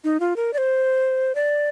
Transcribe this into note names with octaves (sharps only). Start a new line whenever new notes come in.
D#4
F4
A#4
D5
C5
D5